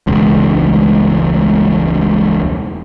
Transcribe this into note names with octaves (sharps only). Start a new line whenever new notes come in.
E1 C#2